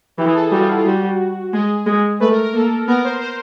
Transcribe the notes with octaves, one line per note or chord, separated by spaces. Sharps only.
E3 G4
G#4
A4
G#4
G3 F#4
F4
E4
F4
G3 F#4
G#3 G#4
G#3
A3 B4
A#4
A#4
A#3 A4
B3 A#4
C5
C5